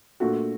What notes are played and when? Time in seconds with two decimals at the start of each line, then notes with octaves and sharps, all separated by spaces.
0.20 A#2 A3 D4 F#4